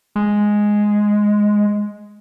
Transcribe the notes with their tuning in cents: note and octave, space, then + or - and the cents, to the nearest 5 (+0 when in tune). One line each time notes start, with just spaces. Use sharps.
G#3 +0